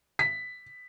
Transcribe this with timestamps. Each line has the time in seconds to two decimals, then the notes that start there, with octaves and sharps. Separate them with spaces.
0.19 B6